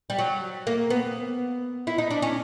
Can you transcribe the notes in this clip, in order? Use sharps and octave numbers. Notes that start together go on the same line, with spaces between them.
G3
F#3
A#3
B3
E4
D#4
D4
C#4